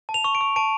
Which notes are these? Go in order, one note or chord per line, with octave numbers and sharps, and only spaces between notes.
A5
F7
C#6
D7
C#6
A5 D7